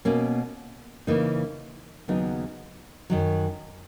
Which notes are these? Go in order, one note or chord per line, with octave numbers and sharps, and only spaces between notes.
B2 A#3 C#4
C#3 E3 A#3 D#4
D#2 C#3 F#3 B3 D#4
F#2 D#3 F#3